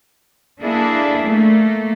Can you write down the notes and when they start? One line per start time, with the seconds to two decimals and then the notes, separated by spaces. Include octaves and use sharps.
0.62 A#3 D4 E4 G#4 A4
1.27 A3 A#3